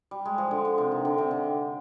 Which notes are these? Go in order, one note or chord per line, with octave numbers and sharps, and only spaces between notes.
G3
G#3
F3
D3
D3
C3
D#3
D3
C3
D3